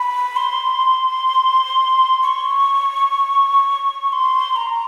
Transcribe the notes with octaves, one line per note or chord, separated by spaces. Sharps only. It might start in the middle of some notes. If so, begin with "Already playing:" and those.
Already playing: B5
C6
C#6
C#6
C6
A#5